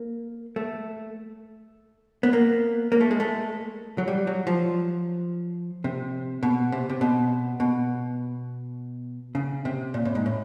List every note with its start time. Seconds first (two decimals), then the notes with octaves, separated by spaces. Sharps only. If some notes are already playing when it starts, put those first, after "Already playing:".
Already playing: A#3
0.56 A3
2.23 B3
2.33 A#3
2.92 A#3
3.01 A3
3.11 G#3
3.20 A3
3.98 F#3
4.08 G3
4.27 F#3
4.47 F3
5.84 C3
6.43 B2
6.72 C3
6.90 C3
7.01 B2
7.60 B2
9.35 C#3
9.65 C3
9.94 A#2
10.05 A2
10.15 G#2
10.26 A2